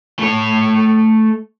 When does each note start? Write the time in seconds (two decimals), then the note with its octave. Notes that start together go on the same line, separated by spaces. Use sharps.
0.19 A3 C#5